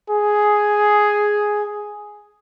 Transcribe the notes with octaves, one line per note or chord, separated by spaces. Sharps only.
G#4